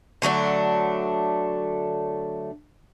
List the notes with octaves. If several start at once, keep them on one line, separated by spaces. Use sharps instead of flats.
D3 F#3 A3 D4